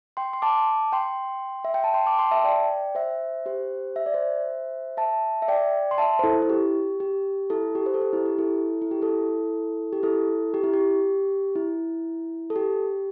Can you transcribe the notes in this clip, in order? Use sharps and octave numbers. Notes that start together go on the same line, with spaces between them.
G5 C6
C6
A5 D6
G5 C6
E5
G5
A5
G5 C6
A5 D6
G5 C6
E5 A5
D5 G5
C5 E5
G4 C5
E5
D5
C5 E5
E5 A5
E5
D5 G5
C6
E5 A5
C5
E4 A4
E4
G4
G4
E4 A4
G4
C5
A4
G4
E4
G4
E4 A4
E4
G4
E4 A4
G4
E4 A4
G4
E4
G4
E4
A4
G4